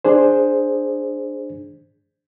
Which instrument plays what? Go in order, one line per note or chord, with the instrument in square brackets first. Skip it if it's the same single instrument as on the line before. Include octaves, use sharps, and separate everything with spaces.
[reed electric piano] D4 G#4 C5